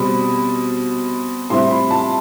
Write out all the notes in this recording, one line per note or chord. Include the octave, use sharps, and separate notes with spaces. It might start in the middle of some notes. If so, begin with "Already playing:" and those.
Already playing: B2 G3 C4 B5
A2 G3 C4 E4 C6
B5
A5